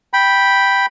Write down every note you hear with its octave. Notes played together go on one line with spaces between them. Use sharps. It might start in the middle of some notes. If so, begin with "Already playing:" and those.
G5 B5